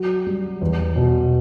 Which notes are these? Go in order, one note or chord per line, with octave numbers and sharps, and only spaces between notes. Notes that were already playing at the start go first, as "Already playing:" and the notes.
Already playing: F#3 F#4
G3
E2
B2